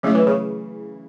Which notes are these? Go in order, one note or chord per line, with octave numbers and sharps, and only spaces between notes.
C#3 F#3 A3 E4 C#5
E3
C#3